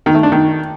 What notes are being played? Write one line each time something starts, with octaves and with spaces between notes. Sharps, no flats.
D#3
A3
D4
D#3